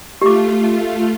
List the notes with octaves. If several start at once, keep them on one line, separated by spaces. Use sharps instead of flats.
A3 F4 G4 D6